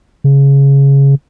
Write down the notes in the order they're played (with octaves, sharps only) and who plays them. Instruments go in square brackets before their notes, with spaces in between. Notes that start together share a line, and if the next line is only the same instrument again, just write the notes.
[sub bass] C#3